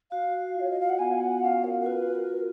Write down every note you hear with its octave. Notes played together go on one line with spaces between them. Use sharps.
F#4 F5
F#4
F4
C#5
D#5
F5
F#5
B3 G#5
F#5
C#4 F5
A#4
F#4 A#4
F4 B4
A#4